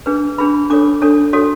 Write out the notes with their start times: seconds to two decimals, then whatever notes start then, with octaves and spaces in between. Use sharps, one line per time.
0.06 D4 G#4 B4
0.38 D4 G#4 B4 B5
0.70 D4 A4 C#5 D6
1.02 D4 A4 C#5
1.33 F#4 A4 C#5